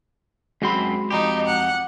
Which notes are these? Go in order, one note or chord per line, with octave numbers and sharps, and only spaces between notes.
F#2 G#3 C4 F#4 B5 C6
F2 D#4 G4
F#5